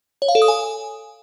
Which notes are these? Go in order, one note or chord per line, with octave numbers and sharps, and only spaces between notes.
C#5
F5
A4
D#6
G#5